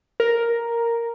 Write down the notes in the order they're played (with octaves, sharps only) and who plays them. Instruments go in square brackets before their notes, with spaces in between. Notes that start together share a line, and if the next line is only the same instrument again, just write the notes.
[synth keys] A#4